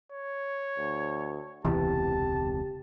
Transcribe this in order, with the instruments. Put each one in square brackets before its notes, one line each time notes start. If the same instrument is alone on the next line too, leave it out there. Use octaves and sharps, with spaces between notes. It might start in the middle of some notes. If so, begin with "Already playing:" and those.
[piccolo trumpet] C#5
[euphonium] D2
[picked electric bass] E1 C#2 C3 [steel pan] E3 [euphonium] G4 [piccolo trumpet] A5